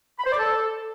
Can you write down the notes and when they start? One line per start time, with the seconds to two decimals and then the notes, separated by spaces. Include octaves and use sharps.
0.19 B5
0.26 C5
0.32 D5
0.39 A4